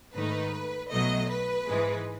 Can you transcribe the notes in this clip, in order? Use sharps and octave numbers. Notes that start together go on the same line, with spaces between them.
G#2 D#3 A3 D#4 B4
B1 B2 F#3 A3 D#5
B4
G#2 E3 G#3